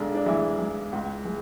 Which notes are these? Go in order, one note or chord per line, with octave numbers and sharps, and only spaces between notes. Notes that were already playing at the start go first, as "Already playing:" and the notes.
Already playing: B1 D3 G#3 D4
D4
E3 G#3 E4
G#3
C#2
G#3